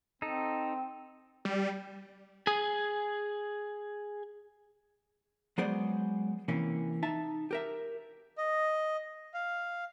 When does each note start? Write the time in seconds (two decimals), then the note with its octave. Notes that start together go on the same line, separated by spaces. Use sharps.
0.22 C4 D#4 A4
1.45 G3
2.47 G#4 G#5
5.58 F#3 G#3 B3 G#4 C5 D5
6.48 C3 E3 A#3 C#4
7.03 D#4 E5 A5
7.51 G4 A#4 E5
8.38 D#5
9.34 F5